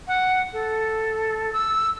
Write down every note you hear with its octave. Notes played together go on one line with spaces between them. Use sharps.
F#5
A4
E6